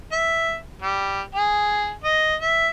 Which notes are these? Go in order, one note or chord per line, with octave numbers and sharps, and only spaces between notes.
E5
G3
G#4
D#5
E5